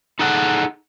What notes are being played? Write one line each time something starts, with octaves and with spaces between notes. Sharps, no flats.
D#4 G#4 A4 F#5